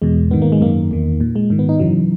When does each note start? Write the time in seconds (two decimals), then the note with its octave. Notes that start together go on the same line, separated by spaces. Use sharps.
0.02 E2 B2 G#3
0.31 G#2 D#3 B3
0.42 A#3
0.52 G#3
0.61 F#2 D#3 A#3
0.91 E2 D#3
1.20 A#2
1.36 G#3
1.50 G#2 D#3
1.59 B3
1.69 D#4
1.79 F#2 C#3 E3 F#3